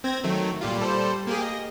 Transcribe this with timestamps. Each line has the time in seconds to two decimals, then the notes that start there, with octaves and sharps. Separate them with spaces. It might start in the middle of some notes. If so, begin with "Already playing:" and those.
0.04 C4 G#6 A#6
0.24 D#3 F#3 A3
0.61 A#2 G3 F4
0.79 G3 A4 C5
1.27 A#3 G4 G#4
1.42 D#5